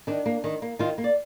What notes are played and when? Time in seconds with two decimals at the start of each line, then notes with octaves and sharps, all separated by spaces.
0.07 D#3 D4
0.26 A#3
0.44 D#3
0.62 A#3
0.79 D#3 F4
0.98 A#3
1.04 D5